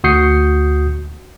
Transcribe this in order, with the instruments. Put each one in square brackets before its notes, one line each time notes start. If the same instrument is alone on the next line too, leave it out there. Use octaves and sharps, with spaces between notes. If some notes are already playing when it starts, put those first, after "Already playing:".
[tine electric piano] D2 F#4 D#6 G6 C7 C#7